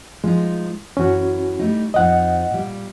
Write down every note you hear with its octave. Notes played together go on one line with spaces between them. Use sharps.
F3 G#3 D#4
F#2 E3 C#4 F#4
G3 A3 D#4
F2 F3 D#4 D#5 F#5
A#2 G3